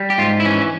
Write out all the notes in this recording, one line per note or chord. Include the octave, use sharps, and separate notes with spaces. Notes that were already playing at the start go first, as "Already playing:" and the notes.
Already playing: G3
G4
G#2 F4
E4
E3 C#4